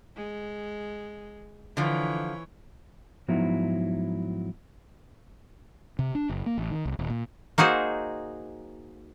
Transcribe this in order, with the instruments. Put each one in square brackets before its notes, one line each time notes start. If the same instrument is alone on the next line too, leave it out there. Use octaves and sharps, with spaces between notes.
[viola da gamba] G#3
[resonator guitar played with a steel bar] D3 F3 [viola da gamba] E3 C#5
[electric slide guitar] G#2 F3 F#3 B3 D#4 E4
[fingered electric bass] C3
D4
F#1
A#3
A1
D#3
C2
D#1
A#2
[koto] A#3 D#4 F#4 G#4 C5